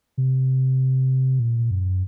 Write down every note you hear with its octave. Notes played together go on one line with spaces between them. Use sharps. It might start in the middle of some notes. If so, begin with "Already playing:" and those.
C3
A#2
F#2